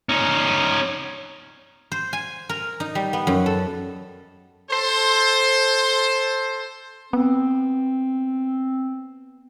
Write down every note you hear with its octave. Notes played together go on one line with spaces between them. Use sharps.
C#4 D#4
C5
G#5
A#4
D#4
G3
B3
F#2
A4
A4 C5
B3 C4